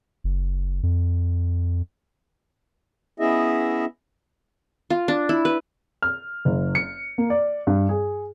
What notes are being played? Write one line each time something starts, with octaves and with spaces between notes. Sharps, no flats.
F#1
F2
B3 C#4 E4 G#4 D#5 E5
F4
D4
E4
B4
F6
F#1
C#7
A#3
D5
G2
G#4